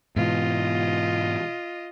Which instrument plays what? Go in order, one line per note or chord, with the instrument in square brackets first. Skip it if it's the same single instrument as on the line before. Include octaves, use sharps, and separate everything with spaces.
[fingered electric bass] G#2 B2 E3 [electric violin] F4 D#5